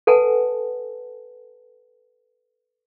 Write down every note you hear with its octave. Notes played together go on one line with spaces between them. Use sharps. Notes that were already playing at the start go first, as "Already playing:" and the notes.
A4 B4 F#5 G#5 A5